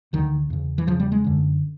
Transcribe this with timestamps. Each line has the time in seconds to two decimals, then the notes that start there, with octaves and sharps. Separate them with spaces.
0.13 D2 D3 D#3
0.50 E2 C#3
0.78 E3
0.87 C#3 F3
0.91 E2
1.00 G3
1.12 G#3
1.24 F#2 D3